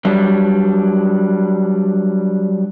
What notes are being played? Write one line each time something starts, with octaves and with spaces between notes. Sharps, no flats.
F#3 G3 D4